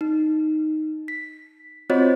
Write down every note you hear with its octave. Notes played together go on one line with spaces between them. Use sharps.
D#4
B6
C4 F4 F#4 C5 C#5 D#5